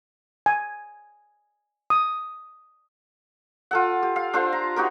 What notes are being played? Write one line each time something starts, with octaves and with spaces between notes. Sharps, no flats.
G#5
D#6
F4 A4 F#5
G4
F5
D4 F4 A4 C5
A#5
D#4 F#4 G4 A#4